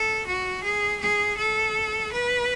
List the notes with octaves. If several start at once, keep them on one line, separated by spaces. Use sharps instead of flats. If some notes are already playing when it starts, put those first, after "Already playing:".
Already playing: A4
F#4
G#4
G#4
A4
B4